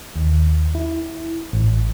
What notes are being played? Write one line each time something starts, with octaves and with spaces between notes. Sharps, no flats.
D#2
E4
A1